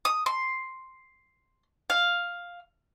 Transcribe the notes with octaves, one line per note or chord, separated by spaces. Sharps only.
D#6
C6
F5